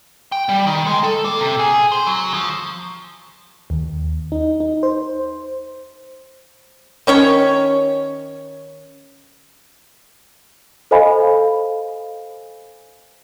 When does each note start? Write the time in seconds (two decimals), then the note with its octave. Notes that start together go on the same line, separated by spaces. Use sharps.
0.32 G5
0.49 G3
0.67 D#3
0.87 G#3
1.04 A4
1.25 A#3
1.40 C3
1.59 G#4
1.92 C5
2.07 F#3
2.34 F3
3.70 D#2
4.32 D#4
4.60 D#4
4.83 C5
7.07 D#3 C#4 C#5
10.91 A4 C5 D#5 F5 G#5 B5